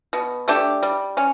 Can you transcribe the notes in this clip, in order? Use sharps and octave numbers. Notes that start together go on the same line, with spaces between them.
B2
A3 D4 G4
G3
C#4